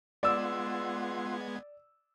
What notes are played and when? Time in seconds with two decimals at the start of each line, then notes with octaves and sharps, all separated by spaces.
0.23 G#3 B3 F4 D5 F#5 C6 E6 G#6